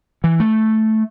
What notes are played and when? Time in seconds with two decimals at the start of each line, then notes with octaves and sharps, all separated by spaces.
0.24 E3
0.40 A3